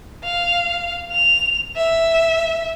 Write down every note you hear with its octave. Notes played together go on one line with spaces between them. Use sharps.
F5
F7
E5